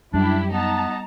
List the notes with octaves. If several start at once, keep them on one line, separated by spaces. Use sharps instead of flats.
F#2 G3 D4 E4 G4
B3 D#4 A5 A#5